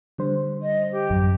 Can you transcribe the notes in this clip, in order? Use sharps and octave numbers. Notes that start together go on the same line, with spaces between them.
D3 G3 C5
D#5
G4
A1 F#2